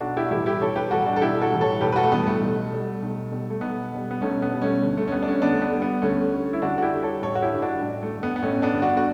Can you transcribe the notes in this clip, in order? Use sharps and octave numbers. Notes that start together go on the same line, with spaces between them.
B1 D4 F#4
E4 G4
F#4
A2 E3 G3 E4 G4
E4 G4
B1 A4 C#5
G4 B4
A2 E3 G3 F#4 A4
D4 F#4
A4
B1 E4 G4
F#4 A4
A2 E3 G3
A4 C#5
B1 G4 B4
B4
F#4 A4
A3
A2 E3 G3 B3
A3
B1
B2 G3
B1
B2 G3
A3
B1 B3
B2 G3
B3
B1 A3 C#4
B3
B2 G3
A3 C#4
D2
A3
C#4
D3 G3 B3
D4
A3 C#4
D2 B3 D4
A3
B3
D3 G3
B3
D2 A3 C#4
D3 G3
E4
D2 D4 F#4
F#4
E4 G4
D3 G3
A4 C#5
A1 A4 C#5
F#4
E4 G4
G2 D3
D4 F#4
A1
A3
G2 D3
B3
B3
A1 A3 C#4
B3 D4
G2 D3
D4 F#4
F#4